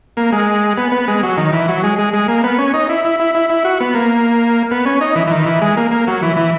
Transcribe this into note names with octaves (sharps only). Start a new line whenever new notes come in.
A#3
G#3
B3
B3
G#3
F#3
D#3
E3
F#3
G#3
G#3
G#3
A#3
B3
C#4
D#4
E4
E4
E4
E4
E4
F#4
B3
A#3
B3
C#4
D#4
E3
E3
D#3
E3
G#3
A#3
A#3
F#3
E3
E3